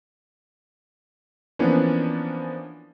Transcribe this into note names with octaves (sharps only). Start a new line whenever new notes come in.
E3 F3 A#3 B3 C#4 D4